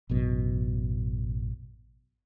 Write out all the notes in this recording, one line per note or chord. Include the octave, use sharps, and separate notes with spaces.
A1 F#2 B2